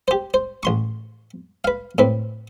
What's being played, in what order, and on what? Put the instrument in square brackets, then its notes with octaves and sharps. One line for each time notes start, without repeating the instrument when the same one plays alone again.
[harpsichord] G4 C5
C5
A1 C6 C#6
B4 F5
A2 C4 B4